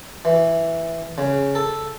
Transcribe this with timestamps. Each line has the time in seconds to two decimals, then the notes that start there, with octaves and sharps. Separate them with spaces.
0.25 E3
1.18 C#3
1.55 A4